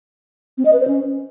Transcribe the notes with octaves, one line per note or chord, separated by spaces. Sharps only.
C4
D#5
B4
C5
C#4